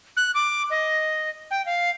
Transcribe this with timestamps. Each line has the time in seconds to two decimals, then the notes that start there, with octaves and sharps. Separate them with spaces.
0.17 F#6
0.35 D6
0.70 D#5
1.51 G5
1.66 F5